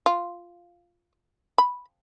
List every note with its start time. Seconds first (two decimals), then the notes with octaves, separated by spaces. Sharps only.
0.06 F4
1.58 B5